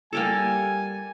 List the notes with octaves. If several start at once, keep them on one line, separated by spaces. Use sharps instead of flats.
G3 A#3 G4 A4 G#5